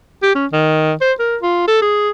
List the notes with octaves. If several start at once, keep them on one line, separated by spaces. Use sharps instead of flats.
G4
C#4
D#3
C5
A#4
F4
A4
G#4